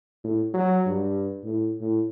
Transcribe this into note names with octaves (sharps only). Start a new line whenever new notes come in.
A2
F#3
G2
A2
A2